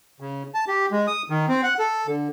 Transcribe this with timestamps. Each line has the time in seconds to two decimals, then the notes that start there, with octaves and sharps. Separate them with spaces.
0.20 C#3
0.54 A5
0.68 G4
0.91 G#3
1.07 D#6
1.30 D#3
1.48 C4
1.63 F#5
1.79 A4
2.07 D3